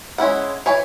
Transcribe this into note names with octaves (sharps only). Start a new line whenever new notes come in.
G#3 C#4 E4 F#5
E3 C#5 G#5